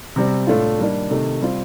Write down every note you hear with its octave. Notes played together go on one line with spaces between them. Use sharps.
C3 G3 C4
A2 A3 D4 F4
D#3 G3 A#3 D4
C3 D#3 A3
G3 C4 F4